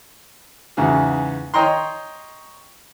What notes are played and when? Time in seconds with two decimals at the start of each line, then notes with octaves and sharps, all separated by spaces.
0.77 E2 G#2 C#3 F#4
1.54 C#5 D#5 G5 A#5 C6